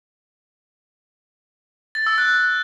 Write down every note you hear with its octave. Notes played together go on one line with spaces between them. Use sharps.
A6
E6
F#6